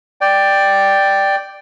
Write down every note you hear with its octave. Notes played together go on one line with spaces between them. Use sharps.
D5 G5